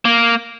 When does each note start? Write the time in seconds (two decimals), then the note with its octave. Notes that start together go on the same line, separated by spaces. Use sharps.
0.05 A#3